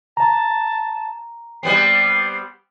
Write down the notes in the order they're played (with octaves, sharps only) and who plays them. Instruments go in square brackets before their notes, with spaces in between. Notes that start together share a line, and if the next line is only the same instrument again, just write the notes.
[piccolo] A5 [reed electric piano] A#5
[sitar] G3 B3 C4 [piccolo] C7